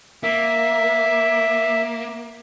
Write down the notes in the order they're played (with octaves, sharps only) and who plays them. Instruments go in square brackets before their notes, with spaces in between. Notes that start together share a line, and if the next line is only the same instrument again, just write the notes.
[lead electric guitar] A#3 [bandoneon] E5